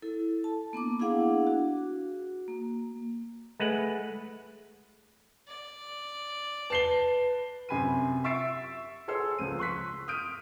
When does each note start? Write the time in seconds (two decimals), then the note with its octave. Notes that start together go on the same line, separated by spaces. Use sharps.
0.02 E4 A4
0.44 A5
0.73 A#3 B3 D4 D6
1.00 D4 E4 G#4 F5 F#5 D6
1.47 F#4
2.48 A#3
3.60 G#3 A3 B4 F#5
5.47 D5
6.70 B4 A5 C7 G7
7.69 F#2 C3 G#5 B5 C6 D#7
8.24 E5 C#6 E6 A6 C7 D7
9.08 G#4 A4 C#5 C6 E6
9.38 C#2 F3 D#7
9.58 C6 C#6 F#6 B6
10.08 D#6 F6 G6 D7 D#7